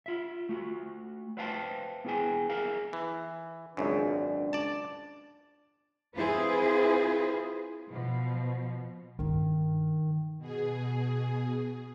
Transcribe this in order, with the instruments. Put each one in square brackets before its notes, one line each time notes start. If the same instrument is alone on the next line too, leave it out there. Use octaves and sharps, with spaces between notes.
[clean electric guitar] F4 E5
A3 F#4
B4 C5 E5 F5 G5 A5
B3 E4 G#4 G5 G#5
G#4 A#4 E5 F5
[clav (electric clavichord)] E3
[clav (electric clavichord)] G#1 C#2 F#2 [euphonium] D4
[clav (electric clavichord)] D5 A5
[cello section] C4 E4 F4 G#4 B4 C5
B2 F3
[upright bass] G2 D#4 [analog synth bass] D#3
[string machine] B2 G#4